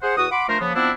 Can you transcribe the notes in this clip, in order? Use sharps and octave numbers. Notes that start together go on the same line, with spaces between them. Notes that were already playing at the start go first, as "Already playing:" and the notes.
G#4 C5 F#5
E2 F#4 F#5 D#6
F#5 B5 C6 D6
F3 A3 D4 A#4 C5
C#3 F3 A#3 B3
F3 B3 C4 D4 E4